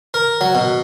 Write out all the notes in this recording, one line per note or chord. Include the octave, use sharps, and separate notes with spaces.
A#4
F#3
B2